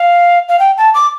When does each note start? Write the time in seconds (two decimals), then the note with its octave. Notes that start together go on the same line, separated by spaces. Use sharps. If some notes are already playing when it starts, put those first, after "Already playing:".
Already playing: F5
0.49 F5
0.59 G5
0.77 A5
0.94 D6